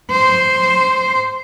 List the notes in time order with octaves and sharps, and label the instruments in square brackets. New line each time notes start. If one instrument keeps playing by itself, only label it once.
[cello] C5